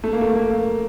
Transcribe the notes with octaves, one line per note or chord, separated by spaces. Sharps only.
A3
A#3
A3
A#3